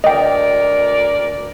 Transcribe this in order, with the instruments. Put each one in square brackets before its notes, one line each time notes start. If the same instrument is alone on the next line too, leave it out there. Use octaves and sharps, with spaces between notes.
[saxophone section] D2 A#4 D5 [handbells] D#5 G5